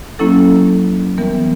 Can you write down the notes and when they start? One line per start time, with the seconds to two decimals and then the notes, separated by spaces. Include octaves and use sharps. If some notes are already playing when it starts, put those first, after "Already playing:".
0.19 F#3 A#3 C#4 E4 A4
1.18 E3 G3 B3 A#4